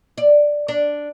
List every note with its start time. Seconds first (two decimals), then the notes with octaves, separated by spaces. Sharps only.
0.18 D5
0.68 D4